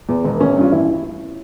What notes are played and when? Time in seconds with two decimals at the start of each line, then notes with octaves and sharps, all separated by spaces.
0.09 E2
0.24 E1
0.33 A#3
0.40 A1 C#4
0.56 G2 F4
0.72 A1 E4